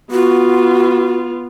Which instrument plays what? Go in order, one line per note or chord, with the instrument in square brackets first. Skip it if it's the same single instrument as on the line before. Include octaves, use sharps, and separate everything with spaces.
[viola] B3 F4 [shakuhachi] F#4